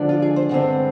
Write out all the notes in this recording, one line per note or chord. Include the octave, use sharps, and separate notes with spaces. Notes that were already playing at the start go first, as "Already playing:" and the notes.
Already playing: D3 F3 G#3 D4
F4
G#4
C5
G2 D3 G#3 C4